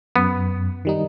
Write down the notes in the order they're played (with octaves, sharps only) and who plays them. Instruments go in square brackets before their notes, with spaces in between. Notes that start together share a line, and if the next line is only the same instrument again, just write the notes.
[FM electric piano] F#2 [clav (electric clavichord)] B3
[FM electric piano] D#3 G3 D#4